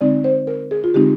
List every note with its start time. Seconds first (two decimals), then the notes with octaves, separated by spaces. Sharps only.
0.01 D3 G#3 C4 D#4 D5
0.24 C5
0.47 A#4
0.71 G#4
0.84 F4
0.94 D3 G#3 C4 D#4 G4